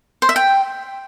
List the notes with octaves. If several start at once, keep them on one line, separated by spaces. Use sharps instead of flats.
C5
E5
G5